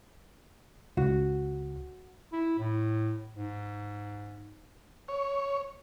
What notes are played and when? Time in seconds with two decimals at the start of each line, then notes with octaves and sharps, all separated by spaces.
0.97 C#2 F#4
2.33 E4
2.58 A2
3.34 G#2
5.08 C#5